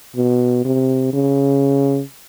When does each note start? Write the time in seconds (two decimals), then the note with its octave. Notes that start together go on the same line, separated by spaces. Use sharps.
0.16 B2
0.65 C3
1.13 C#3